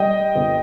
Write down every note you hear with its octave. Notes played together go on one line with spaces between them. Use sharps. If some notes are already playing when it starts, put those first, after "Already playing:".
Already playing: G3 D#5 G5
G1